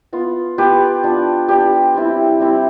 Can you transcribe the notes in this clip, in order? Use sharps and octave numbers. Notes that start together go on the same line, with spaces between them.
B3 F4
B3 F4 G4 B4
B3 D4 F4
B3 D4 F4 G4
G3 C4 E4
G3 C4 E4